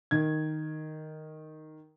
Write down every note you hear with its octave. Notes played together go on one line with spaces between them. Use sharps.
D#3 G#6